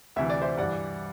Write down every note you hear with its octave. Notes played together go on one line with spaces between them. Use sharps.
D2 C3 E3 E5
D5
C5 E5
G2 E3 D5 F#5